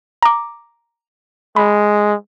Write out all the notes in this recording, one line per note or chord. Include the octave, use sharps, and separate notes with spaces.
A#5 D6
G#3 B5